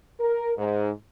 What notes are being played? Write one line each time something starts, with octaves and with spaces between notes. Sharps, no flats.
A#4
G#2